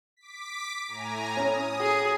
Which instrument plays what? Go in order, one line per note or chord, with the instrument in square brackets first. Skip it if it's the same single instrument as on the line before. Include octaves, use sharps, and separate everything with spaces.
[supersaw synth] D6 B6
A2 G#5 A#5
[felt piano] C#4 [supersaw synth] D#6
[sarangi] G#4